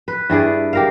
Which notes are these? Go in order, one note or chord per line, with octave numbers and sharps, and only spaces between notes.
B4
G2 E4 G#4 D5
G4 A#4 F5